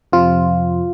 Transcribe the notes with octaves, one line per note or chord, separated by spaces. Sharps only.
F2 C3 F3 F4